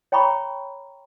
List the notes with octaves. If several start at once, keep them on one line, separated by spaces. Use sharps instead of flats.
C#5 G5 A#5 B5 C#6